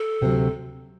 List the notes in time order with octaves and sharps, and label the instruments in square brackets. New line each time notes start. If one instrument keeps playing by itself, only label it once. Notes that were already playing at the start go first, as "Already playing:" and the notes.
Already playing: [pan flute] A4
[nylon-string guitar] D2 C3 D#3 F#3